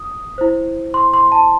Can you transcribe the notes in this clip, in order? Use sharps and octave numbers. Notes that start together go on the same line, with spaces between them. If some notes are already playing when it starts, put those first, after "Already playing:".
Already playing: D#6
E4 C5
C6
C6
A5